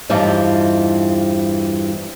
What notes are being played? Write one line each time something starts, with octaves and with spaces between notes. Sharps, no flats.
E2 G2 E3 F3 G3 D#4